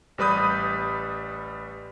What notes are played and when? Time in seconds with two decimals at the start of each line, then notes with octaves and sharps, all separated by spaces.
0.18 A1 G3 B4 B5 D#6 G6